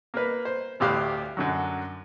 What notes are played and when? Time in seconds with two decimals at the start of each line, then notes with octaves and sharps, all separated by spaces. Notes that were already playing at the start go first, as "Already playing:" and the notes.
0.14 A#3 A#4 B4
0.45 C5
0.80 A1 D2 A2 G4 F5 F#6
1.37 F#2 D3 F#3